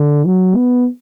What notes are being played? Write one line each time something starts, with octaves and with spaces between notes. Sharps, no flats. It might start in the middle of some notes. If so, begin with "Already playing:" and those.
Already playing: D3
F#3
B3